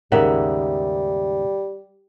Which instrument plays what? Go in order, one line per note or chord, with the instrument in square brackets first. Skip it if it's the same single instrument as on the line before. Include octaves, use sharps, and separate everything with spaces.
[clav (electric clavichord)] D#2 G#2 C#3 [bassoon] G3 [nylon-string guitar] A#4 E5 F#5